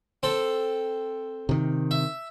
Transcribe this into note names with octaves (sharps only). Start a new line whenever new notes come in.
C4 A4
C3 D#3
E5